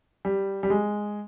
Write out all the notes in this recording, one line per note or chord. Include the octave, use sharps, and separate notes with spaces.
G3
G3
G#3